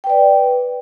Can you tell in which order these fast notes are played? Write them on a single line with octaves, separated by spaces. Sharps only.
G5 B4 D5